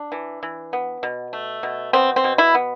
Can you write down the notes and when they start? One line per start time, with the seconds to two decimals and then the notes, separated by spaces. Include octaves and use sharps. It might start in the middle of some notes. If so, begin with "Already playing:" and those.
Already playing: D4
0.12 E3
0.43 E3
0.73 B3
1.03 B2
1.33 A3
1.63 B2
1.93 B3 C4
2.16 C4
2.24 B2
2.38 E4
2.54 B3